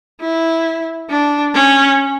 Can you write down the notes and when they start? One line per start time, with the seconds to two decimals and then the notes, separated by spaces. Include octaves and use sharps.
0.21 E4
1.10 D4
1.54 C#4